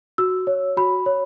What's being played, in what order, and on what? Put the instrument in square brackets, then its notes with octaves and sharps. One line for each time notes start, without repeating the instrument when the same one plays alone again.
[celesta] F#4 E6
C#5
F#4 B5
C#5